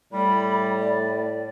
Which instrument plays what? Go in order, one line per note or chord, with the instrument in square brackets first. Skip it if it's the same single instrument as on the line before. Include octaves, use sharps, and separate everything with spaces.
[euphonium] A2 [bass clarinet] G3 [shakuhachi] B5
[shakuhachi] D5